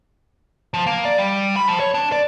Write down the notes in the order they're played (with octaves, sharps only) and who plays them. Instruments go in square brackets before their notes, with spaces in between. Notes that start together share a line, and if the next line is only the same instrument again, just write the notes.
[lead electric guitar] F3
A#3
D5
G3
B5
F3
C#5
D4
D5